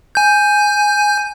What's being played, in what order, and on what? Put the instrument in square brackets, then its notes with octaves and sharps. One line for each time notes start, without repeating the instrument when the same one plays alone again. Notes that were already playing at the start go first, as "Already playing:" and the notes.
[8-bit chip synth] G#5 G6